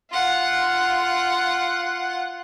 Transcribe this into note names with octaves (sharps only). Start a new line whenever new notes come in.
F4 F#5